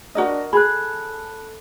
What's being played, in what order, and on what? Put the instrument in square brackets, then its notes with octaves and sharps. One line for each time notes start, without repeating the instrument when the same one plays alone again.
[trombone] D4 [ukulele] F#4 A#4 D#5
[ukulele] G#4 [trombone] A4 [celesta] B5 F#6